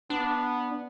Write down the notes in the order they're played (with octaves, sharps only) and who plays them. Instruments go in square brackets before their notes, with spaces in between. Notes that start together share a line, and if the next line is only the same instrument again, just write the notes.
[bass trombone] B3 [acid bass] D4